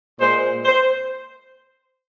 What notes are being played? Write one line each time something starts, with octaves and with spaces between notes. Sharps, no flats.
A#2 G#3 C5
C5